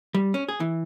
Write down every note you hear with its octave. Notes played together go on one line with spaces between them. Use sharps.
G3
C#4
G#4
E3